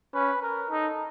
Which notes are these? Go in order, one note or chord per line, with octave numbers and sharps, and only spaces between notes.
C#4 B4
A#4
D#4 A4